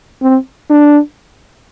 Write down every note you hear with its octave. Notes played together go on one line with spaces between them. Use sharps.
C4
D4